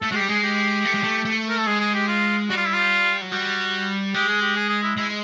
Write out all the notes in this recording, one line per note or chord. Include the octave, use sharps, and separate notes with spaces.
A3 A4
G#3 F#4
G3 G4
G#3 G#4
G4
A3
G#3
A3
A3
A#4
A4
G#3 G#4
G#4
G4
F4
G3 F#4
F4
E4
F4
F#3
G3 F#4
G#3 G4
G#4
G4
G#4
G#4
E4
G#3 E4